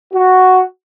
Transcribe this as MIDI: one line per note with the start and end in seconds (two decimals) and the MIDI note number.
0.14 0.62 66